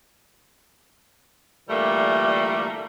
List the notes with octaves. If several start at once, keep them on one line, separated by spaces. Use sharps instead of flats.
A#2 D3 E3 G3 A3 A#3